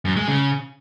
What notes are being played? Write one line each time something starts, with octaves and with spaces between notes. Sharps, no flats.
F#2
G#3
C#3